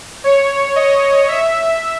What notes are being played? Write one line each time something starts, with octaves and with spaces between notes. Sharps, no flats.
C#5
D#5
E5